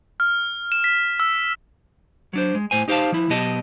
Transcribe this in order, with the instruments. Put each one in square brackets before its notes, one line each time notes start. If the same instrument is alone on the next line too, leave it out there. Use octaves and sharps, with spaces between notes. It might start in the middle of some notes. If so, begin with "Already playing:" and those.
[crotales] F6
E7
B6
E6
[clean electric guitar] F#3 D4 C5
G#3
A2 C5 G#5
D#4 G4 C5 D#5 F5 A5
F3 E4
B2 F#3 B3 G4 D#5 A5